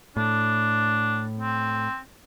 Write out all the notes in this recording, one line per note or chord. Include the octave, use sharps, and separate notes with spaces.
A2 D4
C4